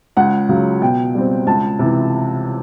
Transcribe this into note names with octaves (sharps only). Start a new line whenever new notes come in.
C#2 F#5
C#3 F#3
B2 G5
G3 C4
C#2 A5
C3 E3